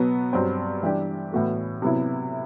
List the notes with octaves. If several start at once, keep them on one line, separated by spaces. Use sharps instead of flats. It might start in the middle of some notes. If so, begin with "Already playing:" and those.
Already playing: B2 F#3 B3
G2 F#3 C4
E3 G3 D4 G4
A2 E3 B3 F#4 A4
C3 F#3 B3 E4